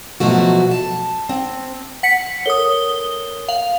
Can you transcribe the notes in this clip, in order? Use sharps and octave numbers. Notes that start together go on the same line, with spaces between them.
B2 F3 F#3 A3 F#4
A5
C4
F#5 B6 C#7
A4 A#4 C#5 D#6 G7
F5 F#7